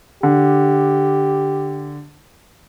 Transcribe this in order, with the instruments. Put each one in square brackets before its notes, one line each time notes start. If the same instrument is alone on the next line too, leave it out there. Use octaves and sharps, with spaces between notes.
[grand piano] D3 [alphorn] G4